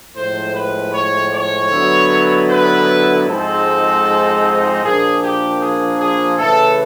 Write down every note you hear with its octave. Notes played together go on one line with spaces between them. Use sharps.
A2 F3 G#3 C5
B4
C#5
C#5
D3 F#3 B3 E4
B4
G#2 F3 G#3 C4 D#4 A4
A#2 F3 A#3 D4 G#4
G4
G#4
G#4
C#3 E3 A3 A4